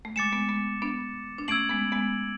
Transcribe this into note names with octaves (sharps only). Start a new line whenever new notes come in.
A3
G#3 D6 A6 C#7 E7
G#3 B3
G#3 B3
B3 D4
D4
A3 C#4 E6 G#6 D7 F#7
G#3 B3
G#3 B3